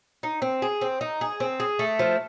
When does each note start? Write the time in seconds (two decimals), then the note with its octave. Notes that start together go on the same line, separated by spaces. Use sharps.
0.23 D#4
0.42 C4
0.62 G#4
0.81 C4
1.01 D#4
1.21 G#4
1.40 C4
1.60 G#4
1.79 A3
1.99 F3